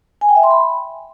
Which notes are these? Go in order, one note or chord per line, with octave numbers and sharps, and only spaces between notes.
G#5
G5
E5
C6
B5